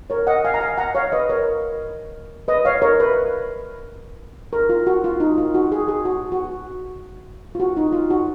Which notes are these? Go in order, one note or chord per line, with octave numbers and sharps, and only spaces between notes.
A#4 C#5
D#5 F#5
F5 G#5
A#5
F5 G#5
F#5 A#5
C#5 F5
B4 D#5
A#4 C#5
B4 D#5
C#5 F5
A#4 C#5
B4
A#4
F4
F#4
F4
D#4
F4
F#4
G#4
G#4
F#4
F#4
F4
F#4
D#4
F4
F#4